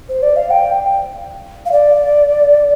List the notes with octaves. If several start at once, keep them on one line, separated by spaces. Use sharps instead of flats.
C5
D5
F5
G5
F5
D5